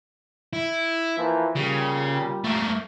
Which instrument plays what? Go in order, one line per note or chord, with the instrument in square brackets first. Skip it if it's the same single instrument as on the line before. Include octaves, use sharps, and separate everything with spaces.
[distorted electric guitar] E4
[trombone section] E3 F3 A#3
[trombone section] A#2 G3 [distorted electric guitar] C#3
[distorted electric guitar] A3 A#3